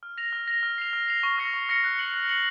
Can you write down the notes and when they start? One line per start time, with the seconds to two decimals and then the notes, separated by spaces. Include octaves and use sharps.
0.03 F6
0.18 A#6 F7
0.33 F6
0.48 A#6 F7
0.63 F6
0.78 C7 F7
0.93 F6
1.08 C7 F7
1.23 C#6
1.38 F6 A#6 C#7
1.54 C#6
1.69 F6 A#6 C#7
1.84 F#6
1.99 C#7 F#7
2.14 F#6
2.29 C#7 F#7